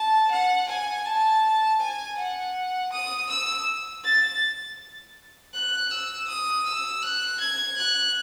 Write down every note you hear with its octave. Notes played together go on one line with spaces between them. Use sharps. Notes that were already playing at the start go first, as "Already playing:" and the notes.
Already playing: A5
F#5
G#5
A5
G#5
F#5
D#6
E6
A6
F#6
E6
D#6
E6
F#6
G#6
F#6